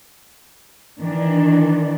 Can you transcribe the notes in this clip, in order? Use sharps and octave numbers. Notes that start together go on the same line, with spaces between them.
D#3 E3 D4